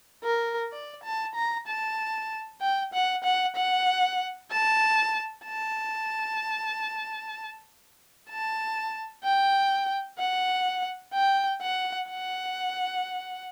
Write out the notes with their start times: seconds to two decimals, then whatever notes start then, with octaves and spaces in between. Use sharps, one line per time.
0.24 A#4
0.72 D5
1.04 A5
1.35 A#5
1.67 A5
2.61 G5
2.93 F#5
3.24 F#5
3.56 F#5
4.51 A5
5.45 A5
8.29 A5
9.24 G5
10.19 F#5
11.13 G5
11.62 F#5
12.09 F#5